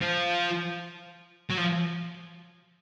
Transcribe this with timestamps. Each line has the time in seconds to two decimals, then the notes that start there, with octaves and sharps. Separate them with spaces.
0.01 F3
1.50 F#3
1.57 F3